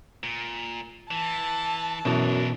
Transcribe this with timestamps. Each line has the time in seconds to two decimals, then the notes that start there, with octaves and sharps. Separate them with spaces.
0.23 A#2
1.11 E3 A5
2.05 F#2 B2 E3 D4 A#4